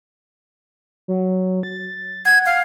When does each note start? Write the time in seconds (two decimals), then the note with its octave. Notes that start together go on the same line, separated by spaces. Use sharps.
1.08 F#3
1.63 A6
2.25 F#5 G#6
2.46 F5